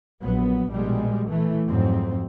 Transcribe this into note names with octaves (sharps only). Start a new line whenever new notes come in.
A#1 F#3 B3
A#1 B2 G3 G#3
E3 A3
F2 G#2 F#3 C4